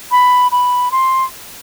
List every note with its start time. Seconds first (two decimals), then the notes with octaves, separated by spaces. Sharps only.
0.11 B5
0.52 B5
0.92 C6